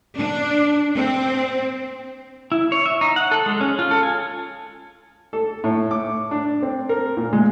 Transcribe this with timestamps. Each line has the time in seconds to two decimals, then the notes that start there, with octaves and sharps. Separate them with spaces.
0.17 D4
0.95 C4
2.52 E4
2.72 C#5
2.86 E5
3.01 D#4
3.16 F#5
3.31 A4
3.46 G#3
3.61 C#4
3.79 F4
3.91 A4
4.03 G#5
5.33 A4
5.64 A2
5.91 D6
6.31 D4
6.62 C4
6.89 A#4
7.17 A#2
7.33 G#3